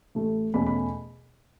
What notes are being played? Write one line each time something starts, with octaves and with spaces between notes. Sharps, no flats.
A1 A2 A3
E2 B2 A3 C#4 B5
B5